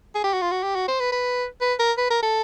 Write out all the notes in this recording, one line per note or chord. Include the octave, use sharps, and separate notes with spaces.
G#4
G4
F#4
F4
F#4
G4
F#4
C5
B4
B4
B4
A#4
B4
A#4
A4